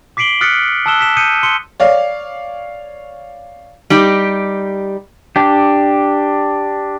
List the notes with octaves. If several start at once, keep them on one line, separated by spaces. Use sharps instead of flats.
D6 B6 C7 D7 F#7 G7
D#6 F6 F#6 A6 B6 C#7
A5 D#6 E6 F#6 E7 G7
B6 E7
D#6 G6 C#7 D#7
C6 C#7 G7
C#5 D5 F5
G3 D#4 G4
D4 G4